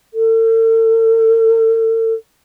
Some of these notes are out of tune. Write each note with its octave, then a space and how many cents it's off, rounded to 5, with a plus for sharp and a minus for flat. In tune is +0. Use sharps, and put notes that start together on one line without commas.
A4 +40